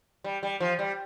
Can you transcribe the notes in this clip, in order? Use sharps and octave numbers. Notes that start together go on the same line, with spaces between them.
G3
G3
F3
G3